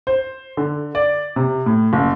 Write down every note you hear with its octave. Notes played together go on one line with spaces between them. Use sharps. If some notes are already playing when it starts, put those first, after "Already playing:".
C5
D3
D5
C3
A2
F#1